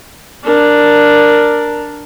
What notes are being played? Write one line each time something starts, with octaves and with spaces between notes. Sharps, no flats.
D4 A#4